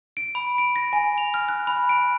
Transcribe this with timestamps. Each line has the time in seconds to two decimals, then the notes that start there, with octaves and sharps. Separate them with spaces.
0.17 D7
0.35 B5
0.58 D7
0.76 A#6
0.93 G#5
1.18 F7
1.34 F6
1.49 F#6
1.67 B5
1.89 D7